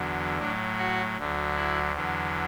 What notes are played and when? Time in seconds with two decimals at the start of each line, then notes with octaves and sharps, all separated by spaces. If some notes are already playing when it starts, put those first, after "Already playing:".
Already playing: E2 D3 F#3
0.38 A2 F#3 D4
0.78 F#4
1.18 D2 D3 F#3
1.56 E4
1.95 E2 D3 F#3